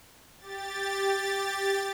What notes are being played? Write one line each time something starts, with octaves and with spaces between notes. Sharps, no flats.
G4 A6